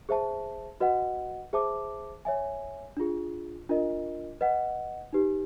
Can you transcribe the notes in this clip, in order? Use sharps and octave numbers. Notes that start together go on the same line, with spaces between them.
G#4 C5 E5 A5
F#4 B4 D#5 F#5
G#4 C5 E5 A5 D6
C#5 E5 G#5
D4 F4 G#4
D4 F4 A#4 D#5
B4 D#5 F#5
D#4 G4 B4